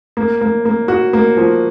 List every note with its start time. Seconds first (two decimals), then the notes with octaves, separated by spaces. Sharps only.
0.17 A#3
0.41 A#3
0.65 A#3
0.88 F#4
1.13 A#3
1.37 F3